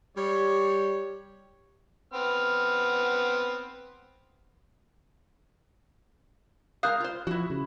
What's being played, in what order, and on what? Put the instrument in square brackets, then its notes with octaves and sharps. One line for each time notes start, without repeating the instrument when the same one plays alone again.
[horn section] G3 C#5
[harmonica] B3 C4 F6
[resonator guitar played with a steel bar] G#3 A#4 F5 [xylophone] D#6 F#6 G6
[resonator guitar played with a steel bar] F4 C5
[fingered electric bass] F3 [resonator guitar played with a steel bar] E4 F#4
[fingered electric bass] C#3